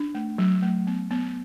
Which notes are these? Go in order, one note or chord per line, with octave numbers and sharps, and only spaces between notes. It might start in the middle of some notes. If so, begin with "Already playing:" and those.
Already playing: D4
A3
F#3
A3
B3
B3